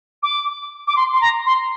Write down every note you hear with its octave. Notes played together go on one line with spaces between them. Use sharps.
D6
D6
C6
C6
A#5
C6